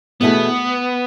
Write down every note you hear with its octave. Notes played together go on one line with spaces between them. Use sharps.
E2 B2 A3 B3 E4 G#4